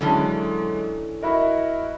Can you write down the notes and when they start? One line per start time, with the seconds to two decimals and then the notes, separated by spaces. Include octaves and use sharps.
0.01 D3 E3 F#3 G#3 C#4
1.23 E4 F#4 A#4 D#5 E5 B5